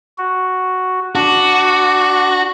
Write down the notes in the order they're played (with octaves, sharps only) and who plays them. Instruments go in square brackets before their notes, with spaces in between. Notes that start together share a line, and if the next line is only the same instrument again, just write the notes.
[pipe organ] F#4
[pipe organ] D4 [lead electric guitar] F#4